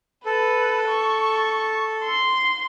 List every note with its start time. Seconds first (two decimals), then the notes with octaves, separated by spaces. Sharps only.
0.26 A4 B4
0.89 C#6
2.04 C6